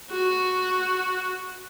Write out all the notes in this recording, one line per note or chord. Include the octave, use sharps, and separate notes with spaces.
F#4